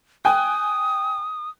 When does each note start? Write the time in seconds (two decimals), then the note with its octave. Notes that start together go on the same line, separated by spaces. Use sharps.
0.25 G5 G#5 D#6 F#6